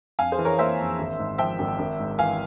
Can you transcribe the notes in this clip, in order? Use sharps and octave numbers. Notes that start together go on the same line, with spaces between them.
F2 F5 G#5
G#4 C5
E3
A#4 C#5
A#3 C5 E5
F2
G#1
G#2
F3 E5 G5
G#1
G#1
G#2
E3 F5 G#5